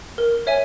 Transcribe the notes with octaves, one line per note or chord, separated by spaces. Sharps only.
A#4
C#5 E5 G#5